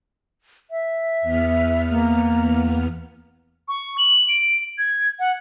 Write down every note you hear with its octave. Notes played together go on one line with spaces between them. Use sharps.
E5
E2 B3 F6
A#3
C#6
F#7
D7
G#6
F#5